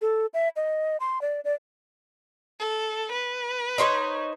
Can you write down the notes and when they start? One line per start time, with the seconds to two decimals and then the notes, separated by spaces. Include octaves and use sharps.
0.02 A4
0.34 E5
0.56 D#5
1.00 C6
1.21 D5
1.45 D5
2.60 A4
3.12 B4
3.78 D#4 C5 C#5